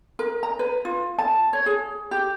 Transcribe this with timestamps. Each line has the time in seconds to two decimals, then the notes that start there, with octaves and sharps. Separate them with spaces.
0.19 A#4
0.43 A#5
0.59 B4
0.85 F4
1.19 A5
1.53 C#5
1.66 G#4
2.11 G4